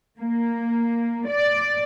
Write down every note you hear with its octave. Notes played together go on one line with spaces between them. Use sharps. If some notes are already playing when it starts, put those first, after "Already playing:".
A#3
D5